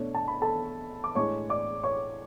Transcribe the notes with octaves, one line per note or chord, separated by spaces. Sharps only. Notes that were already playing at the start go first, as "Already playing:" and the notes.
Already playing: B2 A3 D4 C#5
A5
B5
A4 A5
D6
A2 G#3 D4 C#5 C#6
D5 D6
C#5 C#6